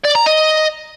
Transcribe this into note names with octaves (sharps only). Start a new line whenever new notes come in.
D5
A#5
D#5